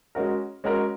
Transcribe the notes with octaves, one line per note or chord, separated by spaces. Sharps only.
G#3 C#4 F#4 A#4
G#3 C#4 F#4 A#4